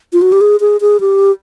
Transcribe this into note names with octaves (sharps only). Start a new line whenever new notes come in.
F4
F#4
G4
G#4
G#4
G#4
G4